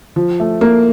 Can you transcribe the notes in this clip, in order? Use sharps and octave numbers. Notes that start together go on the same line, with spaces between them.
F3
A3
A#3